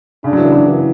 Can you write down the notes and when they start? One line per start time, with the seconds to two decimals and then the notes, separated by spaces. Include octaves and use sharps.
0.24 C#3 D4
0.33 F#3
0.38 E3
0.52 F#3
0.67 E3